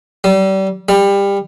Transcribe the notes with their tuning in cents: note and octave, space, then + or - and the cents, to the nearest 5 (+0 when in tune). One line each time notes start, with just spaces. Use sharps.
G3 -30
G3 +25